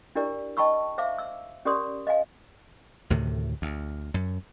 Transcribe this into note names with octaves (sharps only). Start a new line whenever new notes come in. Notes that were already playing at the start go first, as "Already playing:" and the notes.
D4 E4 G4 A#4 D5
D#5 G5 A5 B5 C#6 E6
C5 E5 F5 D6
E6
C#4 G4 A#4 D5 C6 D#6
D#5 F5 G#5
D2 A2 C3 D#3
D2
F#2